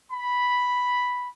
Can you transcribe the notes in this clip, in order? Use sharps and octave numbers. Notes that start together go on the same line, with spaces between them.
B5